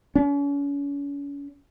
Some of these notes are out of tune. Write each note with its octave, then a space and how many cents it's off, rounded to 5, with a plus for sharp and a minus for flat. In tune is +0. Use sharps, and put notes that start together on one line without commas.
C#4 +40